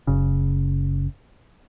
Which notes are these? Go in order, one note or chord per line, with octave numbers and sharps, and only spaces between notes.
F#1 C#3